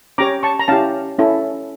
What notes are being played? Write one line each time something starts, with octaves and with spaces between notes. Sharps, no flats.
C#4 G4 C#5 A#5 D6
A5 C#6
A#5
C#4 E4 G4 F5 A5
C#4 E4 A4